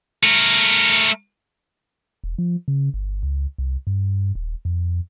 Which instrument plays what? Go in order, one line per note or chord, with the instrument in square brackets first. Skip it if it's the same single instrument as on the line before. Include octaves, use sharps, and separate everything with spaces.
[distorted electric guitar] A3 A#4
[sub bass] E1
F3
C#3
G1
C#2
C2
G2
D#1
F2